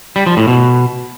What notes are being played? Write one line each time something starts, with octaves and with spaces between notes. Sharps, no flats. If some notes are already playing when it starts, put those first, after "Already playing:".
G3
F3
A2
B2